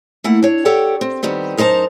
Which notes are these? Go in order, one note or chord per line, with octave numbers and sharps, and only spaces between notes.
A3 A#3 E4 F#5
D4 C#5
G4 A4 C#5 D5 F#5 G5
C4
D#3 G3 B3 C4
F#2 D#4 A#4 C5 A5